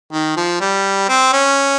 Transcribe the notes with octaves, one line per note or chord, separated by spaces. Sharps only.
D#3
F3
G3
C4
C#4